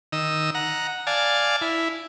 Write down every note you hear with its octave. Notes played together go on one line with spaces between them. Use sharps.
D#3 D#5 E6
F#5 A#5
D5 F5 G#5 A5
E4